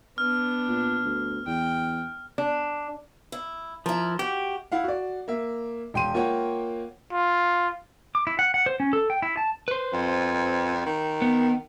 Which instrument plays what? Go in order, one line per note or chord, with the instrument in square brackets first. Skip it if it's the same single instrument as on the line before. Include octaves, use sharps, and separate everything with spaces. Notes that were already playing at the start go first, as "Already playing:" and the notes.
[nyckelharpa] B3 D4 [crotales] F6
[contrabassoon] A#2
D2
[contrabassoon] E2 [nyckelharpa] G5
[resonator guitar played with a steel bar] D4
[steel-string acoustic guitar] E4
[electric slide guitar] F3 [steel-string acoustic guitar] E4 A#4
[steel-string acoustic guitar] F#4 [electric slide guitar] G4
[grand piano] E4 F5 F#5
F#4 D5
A#3 E5
E1 G5 C6 D#7
A#3 F4 C#5 F#5 G5
[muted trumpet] F4
[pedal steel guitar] D6
E4
F#5
F#5
C5
C#4
A4
G5
E4
A5
[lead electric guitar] B4 C5
[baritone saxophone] F2
D#3
[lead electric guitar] B3